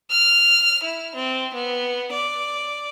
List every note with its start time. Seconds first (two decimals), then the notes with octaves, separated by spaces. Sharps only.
0.11 F6
0.83 E4
1.15 C4
1.53 B3
2.12 D5